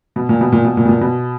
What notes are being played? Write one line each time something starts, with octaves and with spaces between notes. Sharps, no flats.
B2
A#2
B2
A#2
B2
A#2
B2
A#2
B2